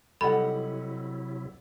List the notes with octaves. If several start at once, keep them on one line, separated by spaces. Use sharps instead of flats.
C3 F#3 G3 D#4 E4 A4 F#5 B5